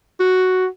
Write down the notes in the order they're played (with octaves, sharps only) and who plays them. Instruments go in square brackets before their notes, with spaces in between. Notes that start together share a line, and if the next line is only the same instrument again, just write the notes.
[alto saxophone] F#4